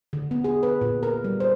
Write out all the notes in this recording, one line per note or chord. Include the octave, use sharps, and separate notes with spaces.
D3
B3
G#4
B4
A#2
A#4
G3
C5